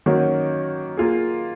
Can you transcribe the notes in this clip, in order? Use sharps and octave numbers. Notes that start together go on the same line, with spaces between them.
D#3 F#3 A#3 C#4 F#4
A#3 F4 G#4